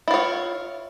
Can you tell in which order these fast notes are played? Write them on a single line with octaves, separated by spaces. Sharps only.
E4 F4 C#5